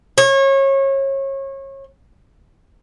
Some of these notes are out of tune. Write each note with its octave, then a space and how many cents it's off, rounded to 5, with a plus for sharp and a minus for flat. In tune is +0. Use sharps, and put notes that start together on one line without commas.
C#5 -30